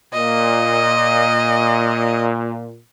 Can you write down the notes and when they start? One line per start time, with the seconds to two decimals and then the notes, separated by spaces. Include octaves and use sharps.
0.13 A#2 D#5